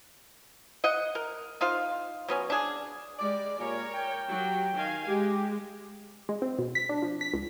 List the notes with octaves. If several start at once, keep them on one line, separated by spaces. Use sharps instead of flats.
D#5 F#5
A#4
D#4 F4 C5 F5
F#3 B3 C#4
D4 G#4
G3 G#3 D5
A#2 G4 A#4 C#5 G#5
G5
F#3 G4
D#3 F5 G#5
G#3 G4
G#3
C4
B2
B6
D4
F3
B6
C#2